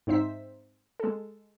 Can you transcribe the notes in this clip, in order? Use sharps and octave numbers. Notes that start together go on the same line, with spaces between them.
G#2 C4 D#4 C5 E5 B6
G#3 A4